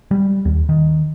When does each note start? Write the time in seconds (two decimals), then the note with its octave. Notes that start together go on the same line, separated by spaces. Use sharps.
0.11 G3
0.45 D#2
0.69 D#3